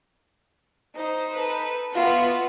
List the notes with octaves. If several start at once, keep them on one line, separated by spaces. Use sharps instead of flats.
D#4 C5
A4 B4
B3 F4 F#4 E5